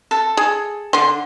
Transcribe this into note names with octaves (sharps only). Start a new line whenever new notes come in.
A4
G#4
D3 C6